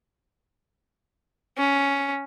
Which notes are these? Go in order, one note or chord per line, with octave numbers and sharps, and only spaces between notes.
C#4